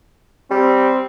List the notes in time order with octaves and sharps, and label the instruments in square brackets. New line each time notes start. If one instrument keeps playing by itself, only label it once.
[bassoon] G3 [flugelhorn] C4